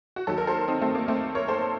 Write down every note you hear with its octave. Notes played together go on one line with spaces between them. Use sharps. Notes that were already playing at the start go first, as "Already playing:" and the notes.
F#4
D#2 D#3 F#3 A4
A#4
A4 C5
C4 D#4
A3 C4
A#3
A3 C4
A#4 C#5
A4 C5